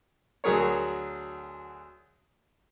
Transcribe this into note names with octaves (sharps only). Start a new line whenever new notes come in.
D2 F#3 G#4 A#4 C#5